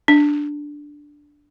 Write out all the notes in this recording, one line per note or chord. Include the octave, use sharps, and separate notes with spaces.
D4